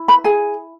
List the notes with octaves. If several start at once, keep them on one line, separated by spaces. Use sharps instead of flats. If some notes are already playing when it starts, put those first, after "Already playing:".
Already playing: E4
B4 B5
G#4 G#5